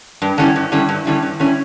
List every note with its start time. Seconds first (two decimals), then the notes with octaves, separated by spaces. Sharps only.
0.22 G2
0.38 D3 G3 C#4 E4
0.56 G2
0.72 D3 G3 C#4 E4
0.89 G2
1.06 D3 G3 C#4 E4
1.23 G2
1.40 D3 G3 C#4 E4